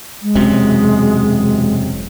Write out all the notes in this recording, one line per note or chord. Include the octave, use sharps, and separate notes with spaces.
G#3
E1 F#2 C3